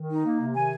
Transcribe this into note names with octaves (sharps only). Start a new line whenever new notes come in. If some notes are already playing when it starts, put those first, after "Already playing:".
Already playing: D#3
D#4
A#3
C3
D#3 G#5